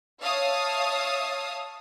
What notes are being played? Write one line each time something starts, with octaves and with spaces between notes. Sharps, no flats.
C#5 E5 F5 A5 D#6